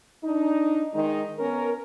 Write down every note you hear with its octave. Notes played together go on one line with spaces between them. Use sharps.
D4 D#4
D#3 G#3 D#4
B3 C#4 A#4